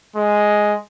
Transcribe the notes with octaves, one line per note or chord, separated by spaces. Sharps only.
G#3